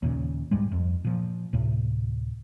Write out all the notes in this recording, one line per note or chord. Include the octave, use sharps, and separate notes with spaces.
D#2 A#2 C#3
C#2 G#2 G3 G#3
F2
A#2 F3
D2 A2 C3